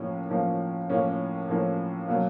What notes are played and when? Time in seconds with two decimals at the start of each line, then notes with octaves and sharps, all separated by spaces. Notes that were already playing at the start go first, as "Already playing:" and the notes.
Already playing: A2 F3 A#3 C#4
0.30 A2 F3 A#3 C#4
0.90 A2 F3 A#3 C#4
1.49 A2 F3 A#3 C#4
2.08 B2 F#3 A#3